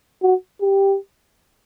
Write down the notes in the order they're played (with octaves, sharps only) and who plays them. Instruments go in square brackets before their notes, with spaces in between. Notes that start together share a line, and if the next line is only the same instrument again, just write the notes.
[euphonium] F#4
G4